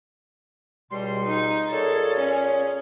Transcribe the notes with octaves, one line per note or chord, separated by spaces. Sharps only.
C#2 B2 G3 C6
D#4
A#2 G#4 A4 C#5
C#4